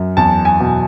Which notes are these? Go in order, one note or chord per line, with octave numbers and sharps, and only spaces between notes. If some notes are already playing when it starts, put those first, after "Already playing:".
Already playing: F#2
E2 A5
G#5
B2